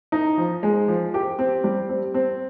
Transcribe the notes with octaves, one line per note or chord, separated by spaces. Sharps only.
D#4
F3
G#3
F3
G4
C4
G3
C4
C4